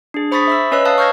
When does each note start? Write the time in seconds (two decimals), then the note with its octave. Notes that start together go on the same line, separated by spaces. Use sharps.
0.14 D4 G#4
0.32 C5 B5 C#6 D#6 A6 B6
0.47 E5 B5 E6
0.72 C#4 B4 C#5 D#5 E6
0.85 F5 A5 D#6 F#6
0.98 C#6 F6 G6 G#6 A#6